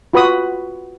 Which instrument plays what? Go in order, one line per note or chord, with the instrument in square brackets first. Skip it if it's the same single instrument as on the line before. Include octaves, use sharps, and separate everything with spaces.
[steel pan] F4 F#4 B4 B5 C#6 D#6